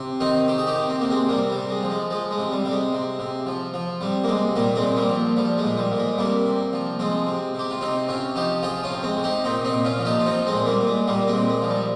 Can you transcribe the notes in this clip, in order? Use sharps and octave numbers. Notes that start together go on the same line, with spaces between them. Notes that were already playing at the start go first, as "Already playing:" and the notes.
Already playing: C3
D#3 C4 D#4
D#3 G4
G#4
D#4 G4
C3
C4
C3 A#3
G#3 C4
C3 G3 A#3
G3
C3
G#3
F3
G#3
F3 G#3
G#3
C3
G3
C3 G3
G#3
C3
C3
F3
F3
C3 G3
A#3
C3 G#3
A#2 G3 A#3
G#3 C4
A#2
G3 A#3
F3
F3 G3
G#3
A#2
G3
A#2
G#3
C3 G3 A#3
C3
F3
F3 G#3 C4
C3
C3 G4
F4
C3 C4 D#4
C3 C#4 F4
F3 D#4 G4
F3 F4 G#4
C#4 F4
C3
G#3 C4
C3
D#4 G4
A#2 C4 D#4
C4 D#4
A#2
C#4 F4
F3
D#4 G4
F4
F3 C4 D#4
G#3 C4
A#2
G3 A#3
A#2
G#3
A#2 G3 A#3
G#3 C4
A#2
G#3
F3
G3